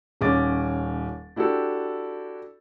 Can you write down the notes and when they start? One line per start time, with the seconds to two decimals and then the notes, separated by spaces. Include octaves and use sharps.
0.21 D#1 C#4 D6 A6
1.36 D4 E4 F#4 G4 A4